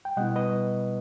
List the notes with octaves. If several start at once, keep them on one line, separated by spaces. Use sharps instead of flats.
G5
B2 G3 B3 E4 D#5 F#5
B4 D#5